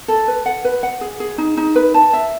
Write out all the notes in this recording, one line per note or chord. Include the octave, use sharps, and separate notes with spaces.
A4
B4
F#5
B4
F#5
G#4
G#4
D#4
D#4
B4
A5
E5